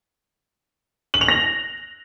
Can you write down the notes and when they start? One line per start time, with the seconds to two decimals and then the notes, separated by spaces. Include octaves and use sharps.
1.14 F#7
1.21 F7
1.28 A#6